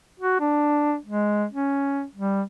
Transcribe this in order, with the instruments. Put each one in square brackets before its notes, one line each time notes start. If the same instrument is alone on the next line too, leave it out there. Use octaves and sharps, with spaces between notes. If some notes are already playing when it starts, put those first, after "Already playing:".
[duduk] F#4
D4
G#3
C#4
G3